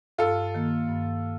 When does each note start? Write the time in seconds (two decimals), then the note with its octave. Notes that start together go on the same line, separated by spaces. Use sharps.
0.18 G2 F4 A4
0.55 D#3 A#3
0.89 G2